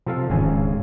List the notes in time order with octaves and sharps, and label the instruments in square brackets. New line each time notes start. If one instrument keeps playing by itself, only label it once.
[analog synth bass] C3 [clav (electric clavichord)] F3 A4 F5
[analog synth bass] D1 [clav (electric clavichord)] G#1 C#3 G#5